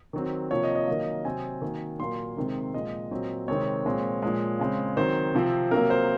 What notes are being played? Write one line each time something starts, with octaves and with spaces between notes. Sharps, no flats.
D#3 F#3 C4
C3 F3 A#3 C#5
D#5
D#5
D#3 F#3 A#3
C3 F#3 C4 G#5
D#3 F#3 A#3
A#2 F#3 A#3 C6
C3 D#3 G#3 C4
A#2 F3 G#3 D#5
A#2 F#3 C4
C3 D#3 G#3 C4 C#5
A#2 F3 G#3 C4
A#2 F3 G#3
C#3 G#3 C4
D#3 F#3 C4 C5
C3 F3 C4
C3 F#3 A#3 A#4
C5